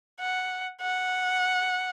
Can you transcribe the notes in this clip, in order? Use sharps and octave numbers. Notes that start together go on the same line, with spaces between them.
F#5
F#5